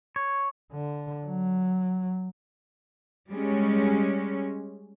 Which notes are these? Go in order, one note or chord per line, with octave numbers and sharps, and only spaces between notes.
C#5
D3
F#3
G3 G#3 C#4